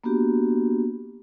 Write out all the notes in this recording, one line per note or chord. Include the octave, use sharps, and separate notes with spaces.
A#3 B3 D4 F#4 G4